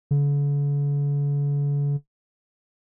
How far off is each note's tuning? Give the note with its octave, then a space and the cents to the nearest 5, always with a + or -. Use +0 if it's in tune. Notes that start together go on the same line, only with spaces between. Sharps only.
D3 -45